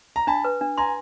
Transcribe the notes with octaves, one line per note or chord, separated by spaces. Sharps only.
A#5
D4 A5 B5
B4
D4
G#5 A#5 C6